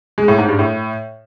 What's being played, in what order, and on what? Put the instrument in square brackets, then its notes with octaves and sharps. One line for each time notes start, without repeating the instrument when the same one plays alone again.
[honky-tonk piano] G#3
A2
G#2
G2
A2